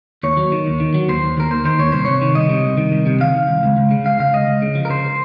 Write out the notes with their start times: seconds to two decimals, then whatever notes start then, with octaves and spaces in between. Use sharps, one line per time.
0.23 D#2 C#5
0.37 F#3
0.52 D#3
0.67 D#2
0.80 D#3
0.94 F#3
1.09 D#2 C5
1.23 D#2
1.37 D#2 A#4
1.51 D#2 C5
1.65 D#3 C5
1.79 D#2 C#5
1.92 C2 C5
2.05 C3 C#5
2.21 D#3
2.35 C2 D#5
2.49 C3
2.64 C2
2.77 D#3
2.92 C2
3.06 C3
3.20 D#3 F5
3.35 D#3
3.49 C2
3.63 C#2
3.77 C#2
3.91 C#3
4.06 C#2 F5
4.20 C#3 F5
4.33 C#2 D#5
4.47 C#2
4.62 C#3
4.75 F3
4.85 A#4
4.89 C#3 C5